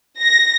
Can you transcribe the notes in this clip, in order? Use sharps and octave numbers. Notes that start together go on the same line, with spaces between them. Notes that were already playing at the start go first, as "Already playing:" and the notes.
A#6